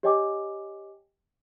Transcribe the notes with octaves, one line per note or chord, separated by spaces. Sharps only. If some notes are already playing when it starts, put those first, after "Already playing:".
G4 C#5 D#5 G5 G#5 D6